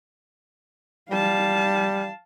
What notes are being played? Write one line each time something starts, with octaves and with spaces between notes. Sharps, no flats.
G3 F5 A5